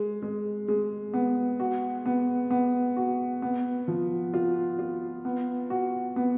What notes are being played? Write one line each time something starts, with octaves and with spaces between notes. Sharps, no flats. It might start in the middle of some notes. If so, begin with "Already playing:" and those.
Already playing: G#3
G#3
G#3
B3
F#4
B3
B3
F#4
B3
F3
F4
F4
B3
F#4
B3